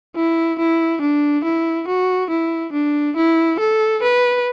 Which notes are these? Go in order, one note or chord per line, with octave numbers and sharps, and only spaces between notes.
E4
E4
D4
E4
F#4
E4
D4
E4
A4
B4